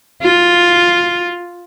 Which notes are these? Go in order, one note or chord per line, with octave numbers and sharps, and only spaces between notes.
F4